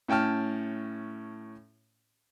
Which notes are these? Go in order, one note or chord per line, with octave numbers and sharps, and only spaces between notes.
A2 C#4 G5 A5 F6